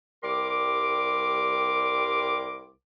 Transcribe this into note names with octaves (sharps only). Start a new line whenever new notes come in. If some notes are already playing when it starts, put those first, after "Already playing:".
C2 G3 A#4 C6 D6